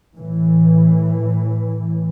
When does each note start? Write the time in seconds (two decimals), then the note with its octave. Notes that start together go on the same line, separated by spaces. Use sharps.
0.16 A2 E3